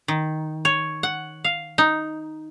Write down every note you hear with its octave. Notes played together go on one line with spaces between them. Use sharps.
D#3
C#5
F#5
F5
D#4